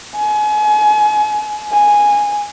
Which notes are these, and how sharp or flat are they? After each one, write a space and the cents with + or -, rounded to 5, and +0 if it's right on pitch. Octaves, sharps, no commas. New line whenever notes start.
G#5 +35
G#5 -5